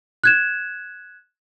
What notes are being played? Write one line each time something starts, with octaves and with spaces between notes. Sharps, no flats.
F#6 G#6 E7